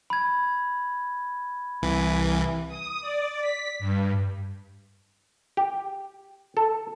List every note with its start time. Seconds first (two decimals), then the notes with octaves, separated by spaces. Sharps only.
0.10 B5 G#6
1.82 C2 E3
2.68 D#6
3.01 D5
3.41 B6
3.79 G2
5.57 G4
6.57 A4